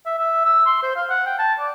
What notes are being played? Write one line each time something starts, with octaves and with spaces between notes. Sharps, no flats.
E5
E5
E6
C6
C5
F5
F#5
G5
A5
D5